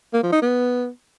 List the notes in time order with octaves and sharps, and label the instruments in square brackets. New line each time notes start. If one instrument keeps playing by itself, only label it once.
[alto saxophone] A#3
F3
D#4
B3